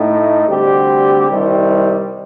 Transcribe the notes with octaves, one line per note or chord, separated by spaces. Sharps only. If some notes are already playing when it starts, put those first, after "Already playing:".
Already playing: A2 A3 D#4
D2 D3 G3 C4 G4
C2 C3 D#3 G3